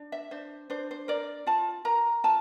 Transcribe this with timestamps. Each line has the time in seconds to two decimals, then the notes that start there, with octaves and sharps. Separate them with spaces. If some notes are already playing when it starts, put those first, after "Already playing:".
Already playing: D4
0.12 E5
0.31 D4 C5
0.70 D4 C5
0.91 C5
1.08 A#4 D5
1.47 F4 A5
1.85 A#4 A#5
2.24 F4 A5